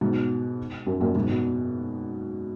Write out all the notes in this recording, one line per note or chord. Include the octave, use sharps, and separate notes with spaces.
G#2 B2
F#2
F#2 A#2
G#2 B2
B2